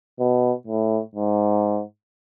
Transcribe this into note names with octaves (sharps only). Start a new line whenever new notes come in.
B2
A2
G#2